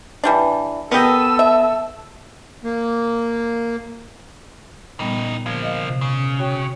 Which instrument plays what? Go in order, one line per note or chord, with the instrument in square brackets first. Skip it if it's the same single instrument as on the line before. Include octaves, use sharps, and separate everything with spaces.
[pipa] E3 G3 D4
[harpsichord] B3 D#5 [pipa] G4 A#4 [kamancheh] A4 E6
[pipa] E5
[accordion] A#3
[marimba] A#2 G3 B3 [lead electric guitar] C#3 D#4
[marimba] D3 G#6 [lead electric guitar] F3 A#3
[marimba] D#5 F5
C3
[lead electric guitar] C#3
[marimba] F#4 C#5 G5